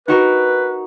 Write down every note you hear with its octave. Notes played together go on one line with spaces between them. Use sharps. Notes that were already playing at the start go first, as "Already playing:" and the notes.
D#4 F#4 A#4 B4